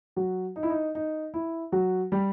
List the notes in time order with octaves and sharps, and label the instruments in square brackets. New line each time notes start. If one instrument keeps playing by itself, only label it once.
[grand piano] F#3 F#4
D#4
E4
D#4
D#4
E4
F#3 F#4
G3 G4